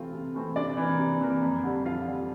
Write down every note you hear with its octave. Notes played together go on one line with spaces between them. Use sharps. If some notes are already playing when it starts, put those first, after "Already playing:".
Already playing: C3 E3 A3 C4 F4
C3
E3 A3 C4
C3 D4 D5
E3
A#3
C3
E3 A#3
F2
D3 G3
F2 F4 F5
D3 G3